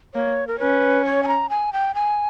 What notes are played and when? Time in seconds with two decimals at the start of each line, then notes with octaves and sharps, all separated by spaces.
0.14 A#3 C#5
0.47 A#4
0.59 C#4 B4
1.05 C#5
1.23 G#5
1.28 A#5
1.50 G#5
1.73 G5
1.95 G#5